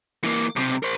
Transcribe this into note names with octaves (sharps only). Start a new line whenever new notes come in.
E3 A#3
B1 C3
A#4 C5